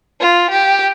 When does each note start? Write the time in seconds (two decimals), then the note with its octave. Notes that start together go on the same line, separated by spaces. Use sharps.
0.21 F4
0.51 G4